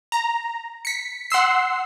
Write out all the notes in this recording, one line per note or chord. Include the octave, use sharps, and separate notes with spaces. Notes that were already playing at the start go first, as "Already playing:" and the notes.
A#5
B6 C#7
F#5 C6 E6 C7